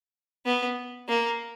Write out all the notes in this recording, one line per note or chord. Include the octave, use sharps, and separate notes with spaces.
B3
A#3